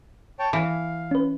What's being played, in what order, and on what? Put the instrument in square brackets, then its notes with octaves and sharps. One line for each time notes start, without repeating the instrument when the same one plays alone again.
[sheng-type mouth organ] C#5 G5 A5
[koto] E3 [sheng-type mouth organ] F5
[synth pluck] C#4 B4